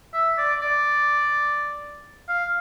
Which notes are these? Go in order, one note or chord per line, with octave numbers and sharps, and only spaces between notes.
E5
D5
D5
F5